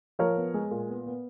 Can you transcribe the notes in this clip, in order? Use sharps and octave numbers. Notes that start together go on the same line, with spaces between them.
F3 A#4 C#5
B3
G#3
A#2
B3
B3